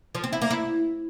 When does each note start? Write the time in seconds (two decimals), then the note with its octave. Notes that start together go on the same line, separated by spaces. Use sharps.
0.15 F3
0.24 C4
0.33 E4
0.42 A#3
0.50 E4